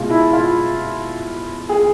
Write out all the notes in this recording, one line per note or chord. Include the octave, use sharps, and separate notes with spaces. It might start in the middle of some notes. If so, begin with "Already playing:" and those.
Already playing: B2 G#3 F4 F#4
E4
F4
G#4